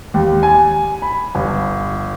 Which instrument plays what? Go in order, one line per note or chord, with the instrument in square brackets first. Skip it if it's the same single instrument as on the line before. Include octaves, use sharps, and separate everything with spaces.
[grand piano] D#2
G#5
B5
G1